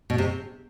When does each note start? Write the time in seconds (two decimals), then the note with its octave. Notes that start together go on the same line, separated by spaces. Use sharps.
0.10 B2
0.18 C3